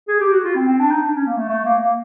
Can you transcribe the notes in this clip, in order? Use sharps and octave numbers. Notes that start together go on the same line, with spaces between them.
G#4
G4
F#4
F4
C4
C4
D4
D#4
D4
C#4
A#3
A3
A3
A#3
A#3